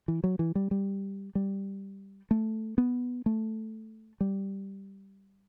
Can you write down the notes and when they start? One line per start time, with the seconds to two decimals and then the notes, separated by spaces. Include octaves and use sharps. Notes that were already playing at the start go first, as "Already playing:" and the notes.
0.08 E3
0.24 F#3
0.39 E3
0.55 G3
0.71 G3
1.35 G3
2.31 A3
2.78 B3
3.26 A3
4.21 G3